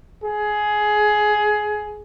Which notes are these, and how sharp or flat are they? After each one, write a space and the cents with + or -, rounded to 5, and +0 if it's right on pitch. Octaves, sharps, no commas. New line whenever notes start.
G#4 +15